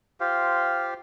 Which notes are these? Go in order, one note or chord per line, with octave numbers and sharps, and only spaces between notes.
F4 G4 C5 F5